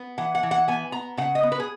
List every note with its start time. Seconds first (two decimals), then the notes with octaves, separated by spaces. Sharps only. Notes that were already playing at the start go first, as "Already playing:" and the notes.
Already playing: B3
0.18 E3 F#5
0.35 F#5
0.43 E3
0.51 F#5
0.68 B3 G#5
0.92 B3 A#5
1.17 C#3 F#5
1.35 D#5
1.43 B3
1.52 B4
1.60 G#4